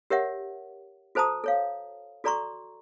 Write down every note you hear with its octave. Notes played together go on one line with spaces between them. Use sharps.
G4 A#4 C#5 E5 F#5
F#4 A4 C5 A5 A#5 D#6
A4 C#5 F5
F#4 A4 D5 A#5 C6 C#6